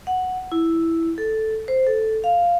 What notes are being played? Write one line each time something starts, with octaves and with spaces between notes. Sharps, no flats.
F#5
E4
A4
C5
A4
F5